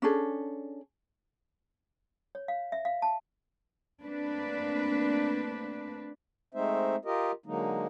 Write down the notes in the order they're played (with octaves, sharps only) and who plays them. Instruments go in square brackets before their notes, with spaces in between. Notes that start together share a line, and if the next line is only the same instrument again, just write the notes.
[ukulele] C#4 D4 G#4 A4
[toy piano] C#5
F5
E5
F5
A5
[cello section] A3 A#3 C4 D4 B4
[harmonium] G#3 A3 C4 D#4 C5 E5
F4 G4 A#4 D#5
D3 F#3 G#3 A#3 D#4